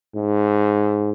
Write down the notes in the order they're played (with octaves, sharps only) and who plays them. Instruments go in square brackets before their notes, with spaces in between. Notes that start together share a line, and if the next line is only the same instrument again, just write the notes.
[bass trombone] G#2